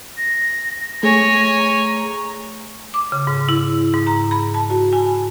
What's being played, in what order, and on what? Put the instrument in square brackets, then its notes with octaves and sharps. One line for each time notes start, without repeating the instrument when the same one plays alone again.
[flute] A#6
[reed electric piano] A3 G#4 [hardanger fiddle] C#5 G#5 [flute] A#6
[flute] A#5
[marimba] D6
C#3
G#2
E4
G#2
A#5
B5
A5
F#4
G#5